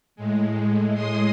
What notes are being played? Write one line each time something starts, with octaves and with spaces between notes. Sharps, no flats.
A2 G#3
C6 D#6